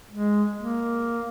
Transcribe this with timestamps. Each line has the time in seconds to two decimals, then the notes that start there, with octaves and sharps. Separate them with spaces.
0.11 G#3
0.57 A#3